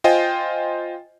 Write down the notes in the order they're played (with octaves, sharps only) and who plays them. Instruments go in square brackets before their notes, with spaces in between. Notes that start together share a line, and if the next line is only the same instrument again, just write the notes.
[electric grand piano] F4 C5 D#5 G5 G#5